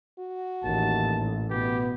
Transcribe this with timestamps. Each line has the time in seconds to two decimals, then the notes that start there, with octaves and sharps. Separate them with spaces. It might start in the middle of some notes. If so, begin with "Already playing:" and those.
0.19 F#4
0.64 A1 D#2 A5
1.50 B2 B3 G4